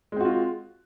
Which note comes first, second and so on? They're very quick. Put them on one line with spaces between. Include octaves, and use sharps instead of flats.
G#3 C4 F#4 F4